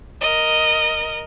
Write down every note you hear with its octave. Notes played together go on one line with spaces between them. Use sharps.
A#4 D#5